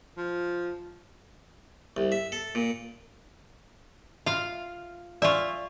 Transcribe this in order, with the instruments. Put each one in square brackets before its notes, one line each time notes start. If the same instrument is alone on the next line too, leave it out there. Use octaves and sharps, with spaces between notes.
[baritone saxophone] F3
[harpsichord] C2
E5
A4
A#2
[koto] F4 F5 [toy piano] E5
[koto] F4 E5 [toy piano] D5 G#5 C#6